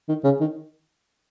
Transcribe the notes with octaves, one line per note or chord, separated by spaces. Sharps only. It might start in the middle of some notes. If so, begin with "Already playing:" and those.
D#3
C#3
D#3